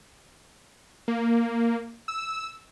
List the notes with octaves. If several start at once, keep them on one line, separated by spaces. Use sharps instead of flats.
A#3
E6